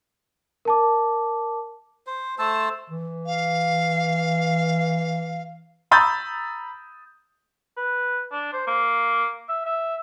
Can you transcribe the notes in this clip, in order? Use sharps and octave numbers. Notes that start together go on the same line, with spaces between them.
A#4 A5 D6
C5
A3 C5 A5 E6
E3
F5
A#5 B5 D#6 E6 G6 A6
B4
D4
C5
A#3
E5
E5